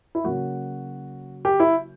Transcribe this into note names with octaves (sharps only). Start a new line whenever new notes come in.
E4
C#3 F#3 A#3 F#4
G4
E4